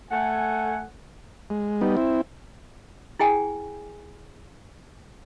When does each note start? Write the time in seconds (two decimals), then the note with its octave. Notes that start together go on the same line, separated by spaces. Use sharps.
0.10 A3 F#5 G#5
1.50 G#3
1.81 G3 B3 D#4
1.97 C4 E4
3.20 E4 G#4 G5 G#5